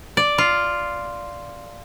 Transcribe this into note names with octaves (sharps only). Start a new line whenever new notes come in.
D5
F4